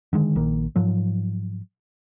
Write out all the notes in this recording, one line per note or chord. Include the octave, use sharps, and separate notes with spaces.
D3 D#3 G#3
A#1 D#3 A#3
G#2 F3 F#3